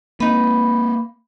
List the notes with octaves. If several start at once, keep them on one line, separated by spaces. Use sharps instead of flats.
A#3 C4 D#4 B4